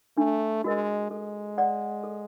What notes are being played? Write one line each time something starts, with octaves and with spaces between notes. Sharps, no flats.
A3 D4
G#3 F#4 A#4 D#5
G#3 A4
D5 F#5
A4